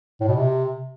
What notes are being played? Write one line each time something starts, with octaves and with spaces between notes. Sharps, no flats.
A2
B2
C3